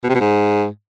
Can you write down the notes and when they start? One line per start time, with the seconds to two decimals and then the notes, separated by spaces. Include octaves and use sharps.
0.03 B2
0.09 C3
0.15 B2
0.20 G#2